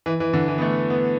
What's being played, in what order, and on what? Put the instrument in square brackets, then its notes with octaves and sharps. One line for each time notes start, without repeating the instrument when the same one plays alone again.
[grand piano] E3
E3
D3
E3
B3
A3
B3